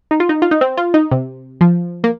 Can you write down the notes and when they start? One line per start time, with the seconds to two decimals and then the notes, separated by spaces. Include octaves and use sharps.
0.11 D#4
0.20 F4
0.29 D#4
0.42 F4
0.51 D#4
0.61 C4
0.77 F4
0.94 D#4
1.11 C3
1.61 F3
2.04 A#3